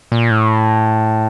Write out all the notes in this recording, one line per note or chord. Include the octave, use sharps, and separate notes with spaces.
A#2
A2